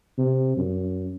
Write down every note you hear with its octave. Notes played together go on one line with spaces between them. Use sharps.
C3
F#2